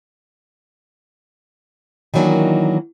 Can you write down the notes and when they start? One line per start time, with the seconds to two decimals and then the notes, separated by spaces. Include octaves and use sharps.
2.14 D#3 E3 F#3 A#3 D4 D#4